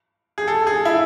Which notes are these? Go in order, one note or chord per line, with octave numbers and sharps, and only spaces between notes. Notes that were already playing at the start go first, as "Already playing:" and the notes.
G#4
A4
G#4
E4